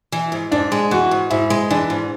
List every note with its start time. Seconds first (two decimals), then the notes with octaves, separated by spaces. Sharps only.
0.12 E3
0.32 G#2
0.52 G#2 D4
0.72 G#3
0.91 E3 F#4
1.11 G#2
1.30 G#2 E4
1.50 G#3
1.70 E3 D4
1.90 G#2